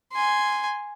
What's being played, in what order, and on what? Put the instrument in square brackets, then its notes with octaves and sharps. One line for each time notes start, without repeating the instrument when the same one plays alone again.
[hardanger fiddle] G#5 C6